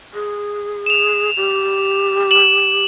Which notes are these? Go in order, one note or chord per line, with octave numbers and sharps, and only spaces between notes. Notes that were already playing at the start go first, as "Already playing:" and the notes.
G#4
E7 F7
G4
E7 F#7